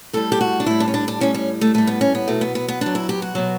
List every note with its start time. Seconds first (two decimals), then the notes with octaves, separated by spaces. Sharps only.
0.13 A2 G3 A4
0.32 G4
0.41 F#4
0.60 D4
0.66 A2 G3 E4
0.80 D4
0.88 C#4
0.94 D4
1.08 D4
1.21 A2 G3 C#4
1.34 C#4
1.61 A3
1.74 A2 G3 A3
1.87 B3
2.01 C#4
2.15 B3
2.28 B2 F#3 A3
2.41 B3
2.55 B3
2.68 B3
2.81 B2 F#3 D4
2.95 E4
3.09 G4
3.22 F#4
3.35 B2 F#3